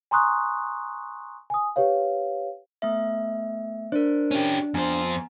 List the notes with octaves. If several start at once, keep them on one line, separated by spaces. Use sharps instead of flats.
G#5 A#5 C6 C#6 D#6 F#6
G#5 D#6
G4 B4 C#5 F5
A3 B3 E5
D4 A#4 C5
C#4 G4
F2 B3 C5 G#5 A#5